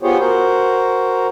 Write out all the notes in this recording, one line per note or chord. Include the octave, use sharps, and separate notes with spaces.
B3 F4 G4 G#4 C5 C#5
F#4 A#4 C5